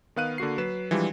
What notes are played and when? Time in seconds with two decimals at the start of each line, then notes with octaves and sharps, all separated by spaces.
0.16 D#3 B3 F5 F#6 D#7
0.38 D3 A#3 F#4 C7
0.58 F#3 B4 E7
0.91 E3 F3 G3 G#3 D4